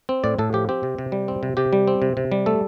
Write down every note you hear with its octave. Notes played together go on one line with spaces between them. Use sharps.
C4
A2 D5
A2 A4
F3 G4
C4 G4
C3
C3
G3
C4
C3
C3 G4
G3
C4
C3
C3
G3
A3 A4